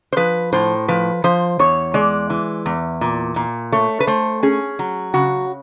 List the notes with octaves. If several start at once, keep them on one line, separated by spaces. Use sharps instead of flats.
C5
F3 B4
A2 C5
F3 B4
F3 C5
E2 C#5
G#3 D5
E3
E2
A#2
A#2
A3 C#5
B4
A3 C5
C#4 G#4
F#3
C#3 F#4